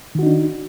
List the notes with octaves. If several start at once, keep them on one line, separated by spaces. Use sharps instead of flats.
D#3 D4 D#4 F#4